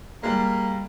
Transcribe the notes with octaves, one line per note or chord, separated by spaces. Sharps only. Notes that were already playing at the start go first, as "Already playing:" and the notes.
G3 G#3 A#3